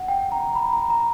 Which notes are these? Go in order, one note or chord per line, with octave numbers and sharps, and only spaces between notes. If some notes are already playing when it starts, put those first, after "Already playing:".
Already playing: F#5
G5
A#5
B5
A#5
A#5